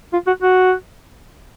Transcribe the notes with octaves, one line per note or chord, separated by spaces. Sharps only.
F4
F#4
F#4